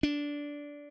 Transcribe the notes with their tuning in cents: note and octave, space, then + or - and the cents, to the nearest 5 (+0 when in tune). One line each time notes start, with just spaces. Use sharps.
D4 -15